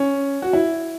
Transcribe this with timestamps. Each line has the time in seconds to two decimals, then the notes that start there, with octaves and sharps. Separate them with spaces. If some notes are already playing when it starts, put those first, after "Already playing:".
Already playing: C#4
0.42 F#4
0.53 E4